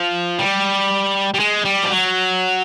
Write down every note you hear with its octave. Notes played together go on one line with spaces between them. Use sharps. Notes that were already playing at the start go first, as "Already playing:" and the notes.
Already playing: F3
G3
G3
G#3
G3
F3
F#3